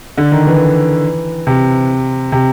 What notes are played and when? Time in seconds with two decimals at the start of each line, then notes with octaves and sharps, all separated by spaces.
0.18 D3
0.32 D#3
0.47 E3
1.47 C3
2.32 C3